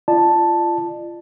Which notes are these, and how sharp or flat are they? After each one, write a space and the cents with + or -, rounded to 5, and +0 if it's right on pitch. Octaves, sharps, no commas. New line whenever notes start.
F4 -30 D5 +40 A5 +0